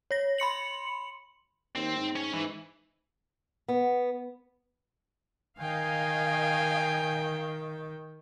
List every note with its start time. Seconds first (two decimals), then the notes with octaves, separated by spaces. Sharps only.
0.11 C#5 A#6
0.38 B5 C6 C#7 F#7
1.76 D#2 C4
1.96 G#2
2.16 C#4 C#5
2.33 G#2 E3
3.68 B3
5.60 D#3 D#5 F5 G5 G#5